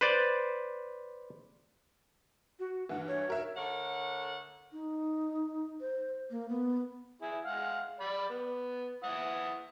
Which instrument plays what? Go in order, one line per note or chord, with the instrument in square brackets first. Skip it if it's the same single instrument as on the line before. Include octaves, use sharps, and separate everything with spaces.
[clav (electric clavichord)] B4 C5 D5
[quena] F#4
[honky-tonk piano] G2 E3 [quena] F#5
[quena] C#5
[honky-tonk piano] F#4 A#4 E5
[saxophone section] D3 A3 A#4 C#5 F#5
[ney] D#4
C5
A#3
B3
[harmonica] E4 G#4
G#3 F5 F#5
D5 B5 D6
B3
E4 F#5 D#6